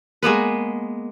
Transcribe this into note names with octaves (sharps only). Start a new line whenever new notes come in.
G#3 A#3 B3 B4